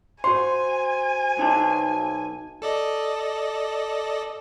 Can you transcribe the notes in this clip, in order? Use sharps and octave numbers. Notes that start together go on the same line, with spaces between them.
F#4 C5 G#5 C6
B1 D#4 A5
A4 D5 D#5